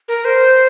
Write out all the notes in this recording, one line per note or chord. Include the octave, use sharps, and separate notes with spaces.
A#4
C5